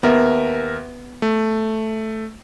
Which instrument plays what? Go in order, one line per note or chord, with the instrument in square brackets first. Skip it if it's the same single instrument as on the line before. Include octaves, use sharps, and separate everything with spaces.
[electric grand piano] D#2 A#4 E5 [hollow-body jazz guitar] B3
[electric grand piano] A3